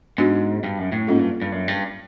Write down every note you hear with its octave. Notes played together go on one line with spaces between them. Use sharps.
G#2 B3 D4 F#4
G2
F#2
A2
G#2 A#3 C#4 F4 A4
G2
G2
F#2
G2